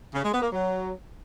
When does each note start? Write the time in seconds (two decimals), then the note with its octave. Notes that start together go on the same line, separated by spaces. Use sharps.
0.13 C#3
0.23 G#3
0.32 B3
0.42 A#3
0.51 F#3